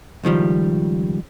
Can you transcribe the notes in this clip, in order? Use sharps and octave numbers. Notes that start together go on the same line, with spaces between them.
C#2 D#3 F3 G3